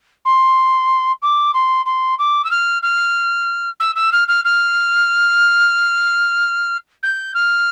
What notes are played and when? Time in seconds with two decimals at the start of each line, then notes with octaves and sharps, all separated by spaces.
0.25 C6
1.22 D6
1.54 C6
1.86 C6
2.19 D6
2.45 E6
2.51 F6
2.83 F6
3.80 E6
3.96 E6
4.12 F6
4.28 F6
4.45 F6
7.03 G6
7.35 F6